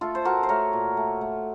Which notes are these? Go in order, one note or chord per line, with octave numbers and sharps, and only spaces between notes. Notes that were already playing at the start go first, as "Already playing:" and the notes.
A3 F4 A4
C5
A3 F#4 A#4
C5
A3 A#4 C#5
A#2
A3
A3